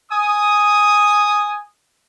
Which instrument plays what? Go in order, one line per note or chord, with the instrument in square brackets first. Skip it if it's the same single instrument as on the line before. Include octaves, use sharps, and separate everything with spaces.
[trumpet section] G#5 D#6